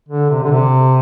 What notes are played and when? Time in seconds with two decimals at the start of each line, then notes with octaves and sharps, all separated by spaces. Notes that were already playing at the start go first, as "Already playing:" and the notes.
0.09 D3
0.29 C3
0.43 D3
0.51 C3